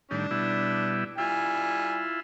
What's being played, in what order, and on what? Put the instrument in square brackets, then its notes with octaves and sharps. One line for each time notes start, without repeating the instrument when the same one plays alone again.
[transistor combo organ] A2 D#3 G3 [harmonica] D4
[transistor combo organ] B2 G3 E4
[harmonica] G3 G#5 [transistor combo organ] E4 F4